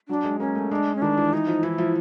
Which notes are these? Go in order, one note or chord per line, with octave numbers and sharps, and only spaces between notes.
F#3 D4
G#3
A#3 C#4
A3
G#3 D4
C#4
D#3 D4
E3
E3 D#4
F3
E3 E4
F3